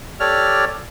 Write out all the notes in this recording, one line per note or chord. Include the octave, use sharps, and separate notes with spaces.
G4 A4 C#5 D5 F6